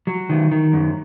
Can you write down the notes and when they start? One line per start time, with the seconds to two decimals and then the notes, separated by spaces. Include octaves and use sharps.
0.07 F#3
0.29 D#3
0.52 D#3
0.73 F#2